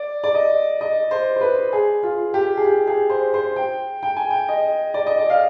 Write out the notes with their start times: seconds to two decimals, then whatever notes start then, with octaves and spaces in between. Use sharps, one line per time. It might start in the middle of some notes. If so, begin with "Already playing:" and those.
Already playing: D5
0.24 D5
0.35 D#5
0.81 D#5
1.11 C5
1.36 C5
1.41 B4
1.73 G#4
2.03 F4
2.34 G4
2.57 G#4
2.65 G4
2.87 G#4
3.10 C5
3.34 C5
3.56 G5
4.03 G5
4.16 G#5
4.30 G5
4.48 D#5
4.94 D5
5.06 D#5
5.19 D5
5.30 F5